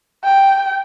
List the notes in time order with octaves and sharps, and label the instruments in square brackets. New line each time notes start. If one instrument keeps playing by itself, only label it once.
[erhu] G5